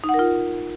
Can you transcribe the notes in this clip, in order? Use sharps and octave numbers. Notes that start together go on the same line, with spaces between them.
D#4
F#5
A#4
F4